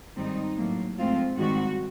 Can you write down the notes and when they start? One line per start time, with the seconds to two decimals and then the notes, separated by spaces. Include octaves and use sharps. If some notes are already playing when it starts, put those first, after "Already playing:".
0.16 G#2 D#3 G3 C4 D#4
0.57 A2 F#3 A#3
0.98 G#2 F3 A3 C4 F4
1.38 G#2 D#3 G3 C4 F#4